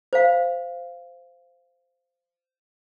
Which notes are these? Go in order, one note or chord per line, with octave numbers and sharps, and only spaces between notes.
C5 F5